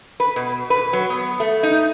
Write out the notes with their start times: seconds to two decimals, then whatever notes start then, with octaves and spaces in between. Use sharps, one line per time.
0.20 B4
0.36 B2
0.70 B4
0.93 F#3
1.10 B3
1.40 A3
1.63 D#4